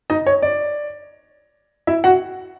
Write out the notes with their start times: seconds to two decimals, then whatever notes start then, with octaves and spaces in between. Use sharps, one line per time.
0.10 D#4 D#5
0.27 C#5
0.42 D5
1.87 E4 E5
2.04 F#4 F#5